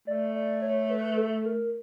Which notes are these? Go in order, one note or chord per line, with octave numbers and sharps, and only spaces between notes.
A3 D5
D5
C#5
B4
A4
A#4